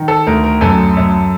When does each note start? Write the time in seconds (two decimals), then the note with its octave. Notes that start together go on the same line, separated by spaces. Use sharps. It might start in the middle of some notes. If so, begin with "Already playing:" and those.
Already playing: D#3
0.08 A4
0.27 D2 A#4
0.44 A#4
0.61 F#2 A4
0.97 F#2